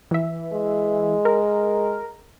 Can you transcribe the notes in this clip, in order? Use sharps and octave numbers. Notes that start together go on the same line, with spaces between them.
E3 E5
G#3
A#4